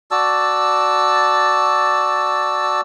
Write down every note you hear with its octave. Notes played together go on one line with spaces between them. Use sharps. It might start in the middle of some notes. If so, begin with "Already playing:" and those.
F#4 D5 A5 E6